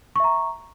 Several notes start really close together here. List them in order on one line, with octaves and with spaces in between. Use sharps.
C#6 E5 A#5